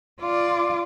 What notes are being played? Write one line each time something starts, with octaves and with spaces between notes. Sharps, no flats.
F4 D5